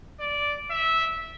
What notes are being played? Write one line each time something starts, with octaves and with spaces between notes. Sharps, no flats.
D5
E5